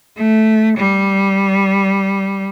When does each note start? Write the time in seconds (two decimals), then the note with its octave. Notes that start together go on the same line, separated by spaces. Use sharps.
0.17 A3
0.77 G3